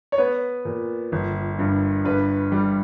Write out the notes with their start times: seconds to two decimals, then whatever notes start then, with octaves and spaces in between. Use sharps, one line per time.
0.12 C#5
0.18 B3 B4
0.65 A#2
1.12 G1
1.59 G2
2.04 G2 B4
2.52 G3